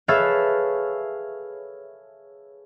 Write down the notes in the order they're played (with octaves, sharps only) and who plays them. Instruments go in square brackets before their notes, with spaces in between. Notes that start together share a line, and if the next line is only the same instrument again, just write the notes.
[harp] G#4 A4 B4 C#5 E5 F5